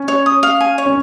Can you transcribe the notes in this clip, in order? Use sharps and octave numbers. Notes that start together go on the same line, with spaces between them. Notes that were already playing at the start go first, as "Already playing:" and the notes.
Already playing: C#4
C#5
D#6
F5
G#5
C#5
C#4